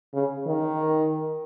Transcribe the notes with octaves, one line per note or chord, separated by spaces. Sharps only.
C#3
D#3